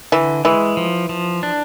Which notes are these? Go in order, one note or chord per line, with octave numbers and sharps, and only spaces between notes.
D3 E3
E3 G#3
F3
F3
D4